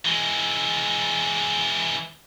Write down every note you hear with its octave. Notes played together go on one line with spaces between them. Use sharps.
E3 G#3